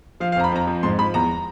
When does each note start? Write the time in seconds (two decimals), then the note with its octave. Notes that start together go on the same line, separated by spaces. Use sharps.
0.20 F3 F5
0.32 F5
0.36 F2 A#5
0.44 B5
0.52 F2 A#5
0.67 F3
0.83 G#2 C6
0.99 F3 B5
1.14 E2 A#5